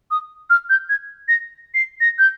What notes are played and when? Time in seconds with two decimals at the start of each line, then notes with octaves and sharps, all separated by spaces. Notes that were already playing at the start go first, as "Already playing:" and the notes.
0.11 D#6
0.50 F6
0.70 G6
0.89 G#6
1.28 A#6
1.74 C7
2.01 A#6
2.19 G6